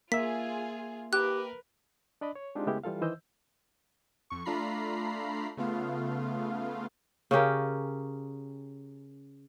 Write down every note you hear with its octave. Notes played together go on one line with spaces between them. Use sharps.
A#3 F4 G#4 E5 B6
G4 A#4 B4 F#6
D4 D5 D#5 B5
C#5
G#3 C4 D4 D#4 F4 G4
C#3 G#3 A3 B3 E4 G4
E3 G3 F4 A4 F5
D#3 E3 C5 D#5 E6 G6
F2 C#6
A3 D4 F4 A#5 B5 C7
C#3 A3 B3 F4 F5
C#3 C#4 G4 A#4